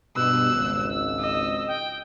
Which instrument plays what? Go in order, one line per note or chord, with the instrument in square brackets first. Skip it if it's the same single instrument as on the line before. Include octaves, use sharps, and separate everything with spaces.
[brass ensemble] G2 B2 [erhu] E6 [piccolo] F#6
[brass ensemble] G#1 C#2
[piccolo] E6
[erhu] D#5
[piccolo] G5